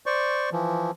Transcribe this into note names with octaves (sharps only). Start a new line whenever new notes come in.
C5 D5 C#6
E3 F3